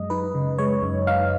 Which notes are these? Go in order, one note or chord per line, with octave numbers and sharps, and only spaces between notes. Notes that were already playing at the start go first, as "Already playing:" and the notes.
Already playing: F#2 G#3 D#5
D#4 B4
C#3
G#3 C#5
F#2
D#4 F5